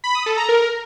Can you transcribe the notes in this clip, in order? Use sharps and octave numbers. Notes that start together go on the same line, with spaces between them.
B5
D#6
A4
A#5
A#4